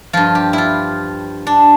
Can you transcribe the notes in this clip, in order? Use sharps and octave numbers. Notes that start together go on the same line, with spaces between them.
G2 F3 F4
G4
E4 F4
D4